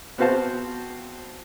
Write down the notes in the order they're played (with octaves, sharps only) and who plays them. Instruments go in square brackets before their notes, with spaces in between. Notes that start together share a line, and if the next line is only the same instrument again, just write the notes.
[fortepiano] B3 C4 F#4 C5 F5 A5